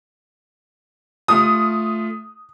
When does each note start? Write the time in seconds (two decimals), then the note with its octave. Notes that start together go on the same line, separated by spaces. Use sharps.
1.28 A3 F4 D#6